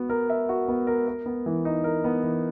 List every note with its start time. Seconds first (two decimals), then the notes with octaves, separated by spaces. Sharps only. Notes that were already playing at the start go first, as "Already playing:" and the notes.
Already playing: B3 F#4
0.10 A#4
0.30 E5
0.49 F#4
0.68 B3
0.87 A#4
1.07 A#4
1.26 B3
1.46 E3
1.65 D#4
1.84 A#4
2.04 B3
2.23 E3